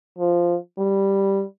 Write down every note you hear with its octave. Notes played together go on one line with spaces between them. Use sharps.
F3
G3